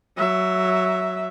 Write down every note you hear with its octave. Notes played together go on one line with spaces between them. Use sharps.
F#3 E5